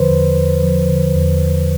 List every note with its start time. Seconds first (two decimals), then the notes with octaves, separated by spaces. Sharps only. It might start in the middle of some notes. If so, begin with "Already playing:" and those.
Already playing: E2 D3 F3 B4 C5
0.10 E2
0.37 E2
0.63 F3
0.89 D3
1.15 E2
1.42 E2